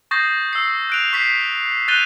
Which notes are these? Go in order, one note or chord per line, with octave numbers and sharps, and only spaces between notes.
C#6 D#6 G6 A6 A#6 C7
E6 C7
F#6 D7 F7
C#6 B6 C7
F#6 G6 A6 D#7 F7 G7